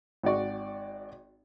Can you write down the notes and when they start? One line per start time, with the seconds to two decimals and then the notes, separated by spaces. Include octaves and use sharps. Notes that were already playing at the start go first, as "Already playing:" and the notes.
0.23 G#1 F#4 D5 C#6